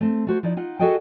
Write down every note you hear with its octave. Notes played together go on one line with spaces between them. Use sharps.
A3 C4
A3 F#4 C5
F3 D#4 E4 D5
D#4 F4 F#5
F#4 G#4 A4 D#5 F#5 G5